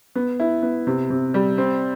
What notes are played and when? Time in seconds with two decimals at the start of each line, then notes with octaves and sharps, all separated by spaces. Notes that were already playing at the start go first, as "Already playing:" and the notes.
0.15 B3
0.40 E4
0.63 B3
0.87 C3
1.10 C3
1.34 G3
1.58 C4